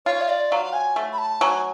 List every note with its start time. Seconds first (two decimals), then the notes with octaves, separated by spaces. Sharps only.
0.06 F4 C#5
0.21 F5
0.29 D5
0.51 F#3 F5
0.73 G#5
0.96 A3
1.13 B5
1.18 A5
1.41 F#3 G#5